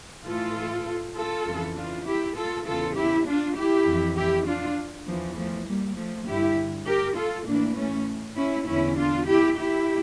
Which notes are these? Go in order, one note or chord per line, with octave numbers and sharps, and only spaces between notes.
A2 E3 F4 A4
F4 A4
F2 C#3 E3
D4 F4
E4 G4
F4 A4
E2 C#3 E3 F4 A4
E4 G4
D4 F4
E4 G4
F2 E3
E4 G4
D4 F4
E2 E3 F3
F3 A3
G3 A#3
F3 A3
G2 D3 E4 G4
G4 A#4
F4 A4
A2 E3 A#3 D4
A3 C#4
C#4 E4
E2 D3 C#4 E4
D4 F4
E4 G4
E4 G4